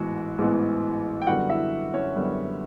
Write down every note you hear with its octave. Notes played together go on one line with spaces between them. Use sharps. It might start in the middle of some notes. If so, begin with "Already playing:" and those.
Already playing: A1 G#2 E3 G#3 B3 F#4
A1 G#2 E3 G#3 B3
G5
F#2 D3 G3 B3 F#4 F#5
E4 E5
C#4 C#5
F#2 D3 G3 B3